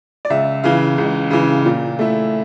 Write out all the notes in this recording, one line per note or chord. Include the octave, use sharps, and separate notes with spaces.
D5
C#2 E5
C#3 E3 F5
C#2
C#3 E3
A#2
A3 E4